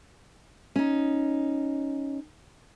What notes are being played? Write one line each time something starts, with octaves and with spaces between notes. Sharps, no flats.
C#4 D#4